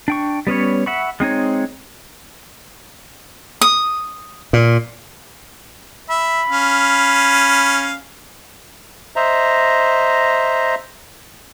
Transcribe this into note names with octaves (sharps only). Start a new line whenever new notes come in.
D4 G5 C#6
G3 B3 C#4 C#5
E5 F#5 B5 C#6
G#3 C4 D#4 C#5
D#6
A#2
E5 B5
C#4 F5
C5 D#5 E5 A#5